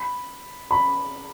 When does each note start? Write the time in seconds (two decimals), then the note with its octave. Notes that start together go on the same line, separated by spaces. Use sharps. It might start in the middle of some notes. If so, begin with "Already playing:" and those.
Already playing: B5
0.71 B5